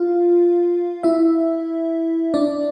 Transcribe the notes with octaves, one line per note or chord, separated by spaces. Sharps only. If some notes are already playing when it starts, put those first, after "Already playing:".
Already playing: F4 F5
E4 E5
D4 D5